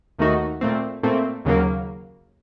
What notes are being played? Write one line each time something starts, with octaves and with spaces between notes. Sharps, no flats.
D#2 D#3 A3 D#4 F#4
A#2 A3 C4
A#2 A3 C4
D#2 C#3 F#3 A#3